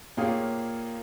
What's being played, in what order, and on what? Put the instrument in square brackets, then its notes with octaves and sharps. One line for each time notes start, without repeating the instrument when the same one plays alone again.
[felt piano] A#2 A#3 G4 G#4 C#5 F5